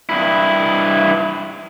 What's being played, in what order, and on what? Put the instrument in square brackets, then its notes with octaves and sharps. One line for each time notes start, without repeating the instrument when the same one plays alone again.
[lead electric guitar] G2 E4